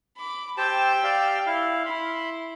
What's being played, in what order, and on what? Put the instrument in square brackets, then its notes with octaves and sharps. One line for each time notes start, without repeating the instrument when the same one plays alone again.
[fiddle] B5 D6
[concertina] G4 C5 A5 [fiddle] G5 E6
[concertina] G4 D5 F5
E4 F5
[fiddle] E4 [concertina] B5 C6